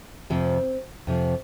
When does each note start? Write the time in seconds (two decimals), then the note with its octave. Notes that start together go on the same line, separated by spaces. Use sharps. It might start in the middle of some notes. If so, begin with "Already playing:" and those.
0.30 F2 C3 F3 C4
1.07 F2 C3 F3